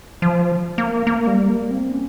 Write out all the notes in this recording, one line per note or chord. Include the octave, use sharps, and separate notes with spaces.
F3
A#3
A#3
G3
A#3
C4
C#4